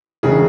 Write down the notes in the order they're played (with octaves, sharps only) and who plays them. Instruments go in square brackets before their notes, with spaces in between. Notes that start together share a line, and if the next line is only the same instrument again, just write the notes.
[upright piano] E1 C#3 G#4